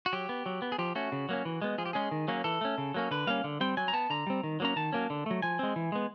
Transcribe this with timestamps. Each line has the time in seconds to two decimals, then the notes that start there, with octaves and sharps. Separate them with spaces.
0.06 F#4
0.13 F#3 G4
0.29 B3
0.46 F#3
0.62 B3
0.72 G#4
0.78 F3 G4
0.95 A3 C#4 F#4
1.12 C#3
1.29 F#3 A#3 C#4
1.45 E3
1.62 G#3 B3
1.78 F3 G#4
1.86 G4
1.93 G#3 C#4 G#4
2.11 D#3
2.28 F#3 A#3 C#4
2.44 E3 A4
2.61 A3 C#4
2.78 C#3
2.94 F#3 A#3 C#4
3.11 D3 B4
3.27 G3 A#3 C#4 F5
3.44 D3
3.61 G3 C4 G5
3.77 F#3 G#5
3.88 A#5
3.93 B3 A5
4.10 D3 A#5
4.27 G3 C4
4.43 D#3
4.60 F#3 A#3 C#4 A#5
4.76 D#3 A5
4.93 F#3 A#3 C#4
5.10 D3
5.26 F#3 A3
5.42 F3 G#5
5.59 G#3 C4
5.76 E3
5.92 G#3 B3